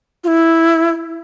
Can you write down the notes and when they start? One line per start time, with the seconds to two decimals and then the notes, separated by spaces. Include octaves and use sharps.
0.24 F4
0.28 E4